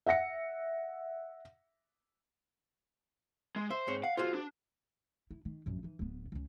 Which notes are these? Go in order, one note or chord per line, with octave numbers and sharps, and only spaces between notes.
E5 F#5 A#6 C#7
G#3
C5 E5
G#2 C4 C#5
F5 F#5
F4 F#4 G#4 C5
D4
E4
D#3
A#1 F#2
E3 D#4
D1 B3
C#2 C#3